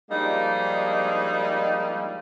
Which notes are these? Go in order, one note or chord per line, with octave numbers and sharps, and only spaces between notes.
F3 G3 G#3 A#3 D4 D#4